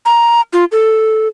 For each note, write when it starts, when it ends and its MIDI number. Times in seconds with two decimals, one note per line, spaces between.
0.06 0.41 82
0.53 0.64 65
0.72 1.28 69